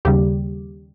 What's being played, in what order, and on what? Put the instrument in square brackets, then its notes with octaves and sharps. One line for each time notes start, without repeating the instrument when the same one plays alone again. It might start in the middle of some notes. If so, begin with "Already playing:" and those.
[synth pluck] D#2 C#3 G3 G4